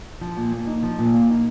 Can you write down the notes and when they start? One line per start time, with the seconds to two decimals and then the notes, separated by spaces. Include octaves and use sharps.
0.21 F3
0.37 A#2
0.52 A#3
0.67 D#4
0.83 F3
0.98 A#2
1.14 A#3
1.29 D#4